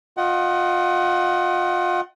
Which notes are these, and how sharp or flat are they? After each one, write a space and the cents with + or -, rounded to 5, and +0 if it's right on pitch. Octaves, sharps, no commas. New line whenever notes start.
F4 +30 D#5 +0 F#5 +30